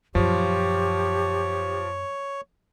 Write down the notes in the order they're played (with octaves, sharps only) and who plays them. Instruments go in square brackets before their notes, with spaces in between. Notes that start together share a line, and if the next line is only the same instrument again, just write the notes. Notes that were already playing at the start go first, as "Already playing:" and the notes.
[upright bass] F#2 A#2 [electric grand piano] F3 F4 [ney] G4 [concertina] C#5